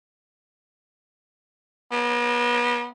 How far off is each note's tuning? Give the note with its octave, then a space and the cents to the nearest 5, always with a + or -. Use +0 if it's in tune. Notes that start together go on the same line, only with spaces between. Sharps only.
B3 -35